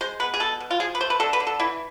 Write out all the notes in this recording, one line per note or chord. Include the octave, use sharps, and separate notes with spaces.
G#3 C5
B3 B4
G#4
B2 A4
B2
F4
F3 G#4
B4
A3 C5
B4
D3 A4
B4
D3
A4
E3 E4